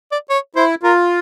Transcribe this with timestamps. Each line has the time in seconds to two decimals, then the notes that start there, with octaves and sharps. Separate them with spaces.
0.12 D5
0.30 C#5
0.56 E4 C5
0.83 F4 A#4